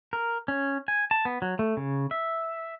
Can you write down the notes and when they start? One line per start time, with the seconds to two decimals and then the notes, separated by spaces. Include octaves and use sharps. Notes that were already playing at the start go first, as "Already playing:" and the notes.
0.13 A#4
0.48 C#4
0.88 G#5
1.11 A5
1.25 B3
1.42 F#3
1.59 A3
1.77 C#3
2.11 E5